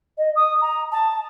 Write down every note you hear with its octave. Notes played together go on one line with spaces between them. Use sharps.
D#5
D#6
A#5
A5